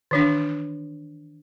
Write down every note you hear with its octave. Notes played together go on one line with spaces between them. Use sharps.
D#3 E3 D4